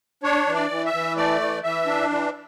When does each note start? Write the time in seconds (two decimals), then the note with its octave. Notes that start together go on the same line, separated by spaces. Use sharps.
0.23 D4 C#5
0.47 E3
0.55 D5
0.70 E3
0.85 E5
0.94 E3
1.17 A3 D5
1.40 E3
1.64 E3 E5
1.87 D4
2.10 E3